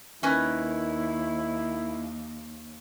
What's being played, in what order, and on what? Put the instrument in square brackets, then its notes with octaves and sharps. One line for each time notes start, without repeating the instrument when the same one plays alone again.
[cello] D#2 [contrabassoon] D#3 [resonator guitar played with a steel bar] C#4 A#4 B4 [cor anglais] E4